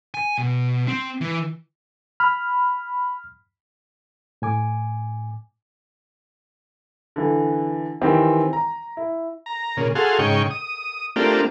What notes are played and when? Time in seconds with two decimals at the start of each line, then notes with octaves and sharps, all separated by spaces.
0.14 G#5
0.38 B2
0.88 C4
1.21 E3
2.20 B5 F6
4.42 A2 G#5 D6
7.16 D3 E3
8.01 D#3 E3 C4 G4
8.53 A#5
8.97 E4
9.46 A#5
9.77 A#2 C#3
9.95 F#4 G#4 A4 F5 C6
10.19 G#2 C#3 D#4 G5 C#6
10.51 D#6
11.16 A3 A#3 C4 D4 F4 G4